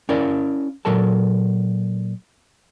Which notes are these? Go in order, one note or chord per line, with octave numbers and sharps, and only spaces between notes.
C#4 E4 A#4 D5 F5
A#2 F#3 A4 A#4 A5